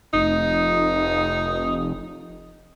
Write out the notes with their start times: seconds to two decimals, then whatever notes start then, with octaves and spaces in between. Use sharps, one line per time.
0.14 F1 D#4